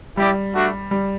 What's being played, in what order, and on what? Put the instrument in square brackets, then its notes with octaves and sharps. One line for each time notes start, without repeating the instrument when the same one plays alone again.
[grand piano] G3 [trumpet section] E4 G4 D5
[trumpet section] A3 D4 F#4
[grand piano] G3